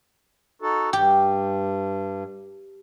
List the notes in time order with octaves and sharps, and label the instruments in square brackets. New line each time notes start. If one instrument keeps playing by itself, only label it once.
[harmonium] D#4 F#4 A4
[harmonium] G2 [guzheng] G4